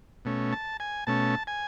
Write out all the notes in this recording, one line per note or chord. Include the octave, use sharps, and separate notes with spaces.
B2 A3 C#4
A5
G#5
B2 A3 C#4 A5
G#5